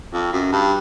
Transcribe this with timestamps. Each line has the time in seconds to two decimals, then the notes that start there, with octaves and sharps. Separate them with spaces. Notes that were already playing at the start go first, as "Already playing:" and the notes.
0.13 F2
0.33 F#2
0.52 G2